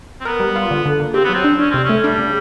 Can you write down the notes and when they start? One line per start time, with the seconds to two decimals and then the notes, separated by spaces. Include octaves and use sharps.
0.21 C4
0.25 B3 A#4
0.40 G3
0.56 F4
0.71 D3
0.86 D3
1.00 A#3
1.14 C4 G4
1.24 B3
1.29 F#3 C4
1.44 D4
1.59 C#4 D4
1.71 C3 C4
1.84 C#4
1.89 A3
2.03 G3 D4
2.18 C#3